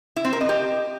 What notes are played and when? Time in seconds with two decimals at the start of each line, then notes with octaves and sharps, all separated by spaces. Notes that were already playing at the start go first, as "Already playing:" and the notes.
0.16 E4
0.25 C4
0.33 A#4
0.41 D#5
0.49 G4